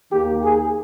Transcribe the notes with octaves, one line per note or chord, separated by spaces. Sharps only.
D#2 D#3 A#3 G4
G#4